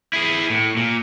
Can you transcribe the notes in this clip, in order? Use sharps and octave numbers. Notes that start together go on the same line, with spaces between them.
E4 G#4
A2
A#2